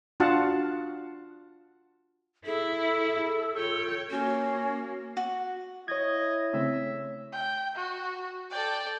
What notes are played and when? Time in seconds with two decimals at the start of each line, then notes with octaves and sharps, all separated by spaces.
0.20 D4 F4 F#4 F5 F#5 A5
2.46 E4 G#4 A4
3.56 F4 C#5 G5
4.10 A#3 C#4 F#4
5.17 F#4
5.88 E4 C#5 D#5 G#6
6.53 C#3 A3 C4 E5
7.32 G5
7.76 F#4
8.51 A4 D5 G5